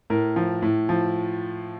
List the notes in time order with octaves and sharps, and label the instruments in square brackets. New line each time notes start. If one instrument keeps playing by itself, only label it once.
[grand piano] A2 A#4
F3
A2
F3